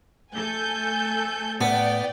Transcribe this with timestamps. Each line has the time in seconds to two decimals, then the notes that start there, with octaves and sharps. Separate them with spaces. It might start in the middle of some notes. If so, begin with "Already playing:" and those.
0.32 A3 A4 G#5 G6
1.61 A2 B3 D5 G5